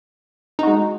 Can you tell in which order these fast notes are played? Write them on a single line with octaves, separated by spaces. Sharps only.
D#4 F#4 G#3